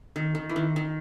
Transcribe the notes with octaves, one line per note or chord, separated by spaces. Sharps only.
D#3
D#3
E3
D#3
D#3